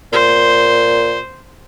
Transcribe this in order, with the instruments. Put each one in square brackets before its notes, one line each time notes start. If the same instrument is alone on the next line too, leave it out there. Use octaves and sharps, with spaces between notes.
[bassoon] A#2 [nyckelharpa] C5